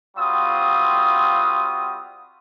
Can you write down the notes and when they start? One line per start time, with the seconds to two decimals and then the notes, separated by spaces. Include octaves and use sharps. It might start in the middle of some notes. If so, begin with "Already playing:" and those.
0.17 G3 C4 F4 F#4 D#6